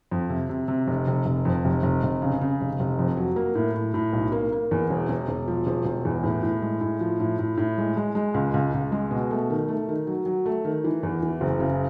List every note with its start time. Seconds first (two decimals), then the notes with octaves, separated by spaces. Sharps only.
0.11 F2
0.30 C3
0.49 C3
0.68 C3
0.87 F1
1.07 F1
1.26 F1
1.45 F2
1.65 F1
1.83 F1
2.03 F1
2.22 C#3
2.41 C#3
2.61 F1
2.80 F1
2.99 F2
3.17 F#3
3.36 A#3
3.55 A2
3.74 A2
3.94 A2
4.13 B1
4.32 A#3
4.52 A#3
4.71 E2
4.90 E1
5.09 E1
5.29 E1
5.48 F3
5.67 E1
5.86 E1
6.05 E2
6.24 A2
6.43 A2
6.62 G#3
6.81 A2
7.01 F3
7.20 A2
7.39 A2
7.58 A2
7.78 G#3
7.97 G#3
8.15 G#3
8.34 C#2
8.54 C#2
8.74 C#2
8.92 G#3
9.11 B2
9.30 A3
9.50 D#3
9.68 A3
9.89 D#3
10.07 F#3
10.26 F#3
10.46 A3
10.65 D#3
10.84 E3
11.03 E2
11.23 E3
11.41 F#1
11.60 C#3